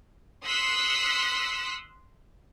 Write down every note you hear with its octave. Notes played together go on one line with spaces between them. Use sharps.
C6 D#6 E6 F#6 B6 C#7